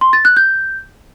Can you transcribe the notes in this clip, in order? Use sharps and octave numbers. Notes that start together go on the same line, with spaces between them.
C6
A6
F#6
G6